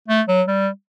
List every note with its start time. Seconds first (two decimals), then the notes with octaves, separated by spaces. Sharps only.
0.08 A3
0.28 F#3
0.48 G3